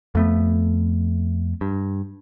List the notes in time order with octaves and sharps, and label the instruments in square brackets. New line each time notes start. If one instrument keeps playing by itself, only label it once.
[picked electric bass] F2 A3 B3
G2